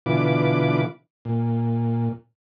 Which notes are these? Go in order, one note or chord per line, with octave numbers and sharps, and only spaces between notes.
B2 D3 E3 F4 B4 D6
A#2